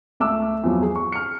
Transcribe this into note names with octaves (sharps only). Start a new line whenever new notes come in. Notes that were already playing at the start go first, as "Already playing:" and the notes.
C#2 A3 D6 E6
E2 F3 F#3
G#4
C#6
F6 C#7